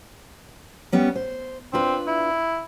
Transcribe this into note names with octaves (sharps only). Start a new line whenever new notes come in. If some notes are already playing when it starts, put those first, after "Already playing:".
G3 B3 C#4
C5
C4 D4 F4 B4
E4